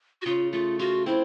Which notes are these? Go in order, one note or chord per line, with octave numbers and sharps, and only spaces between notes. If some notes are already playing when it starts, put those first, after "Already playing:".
F#4
C#3 F4
A3 F4
F4 F#4
C4 E4